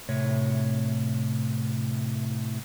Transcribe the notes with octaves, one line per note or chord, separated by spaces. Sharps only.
A2 C3 C#5